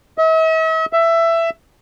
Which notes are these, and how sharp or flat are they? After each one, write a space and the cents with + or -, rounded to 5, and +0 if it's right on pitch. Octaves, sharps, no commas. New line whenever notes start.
E5 -45
E5 +15